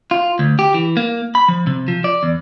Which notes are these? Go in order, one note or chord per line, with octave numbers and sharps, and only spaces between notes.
F4
D2
G4
E3
A#3
B5
F3
C3
F3
D5
E2